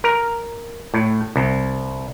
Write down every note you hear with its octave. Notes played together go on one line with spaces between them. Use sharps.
A#4
A2
C2